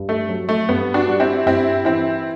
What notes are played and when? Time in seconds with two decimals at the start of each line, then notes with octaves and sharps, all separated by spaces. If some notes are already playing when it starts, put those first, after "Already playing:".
Already playing: G2
0.09 A3
0.29 F#3
0.49 A3
0.69 G2 B3
0.94 D4 F#4
1.07 G3
1.20 C4 E4
1.46 G2 C4 E4
1.85 E3 C4 E4